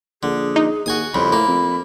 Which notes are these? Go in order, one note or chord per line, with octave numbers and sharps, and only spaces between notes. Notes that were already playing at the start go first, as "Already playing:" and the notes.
A#1 D3 G#4
D#4
D#2 F#4 G#5 D#6
C2 F2 C#3 B5
A2 A#3
F2